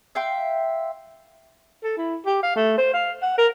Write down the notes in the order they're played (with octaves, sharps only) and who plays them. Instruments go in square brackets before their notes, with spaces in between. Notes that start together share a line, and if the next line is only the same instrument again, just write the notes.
[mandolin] E5 F5 G5 C6
[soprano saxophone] A4
E4
G4
F5
A3
C5
F5
F#5
A#4